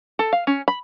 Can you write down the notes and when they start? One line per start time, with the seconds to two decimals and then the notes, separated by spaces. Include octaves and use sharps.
0.19 A4
0.33 F5
0.47 C#4
0.68 B5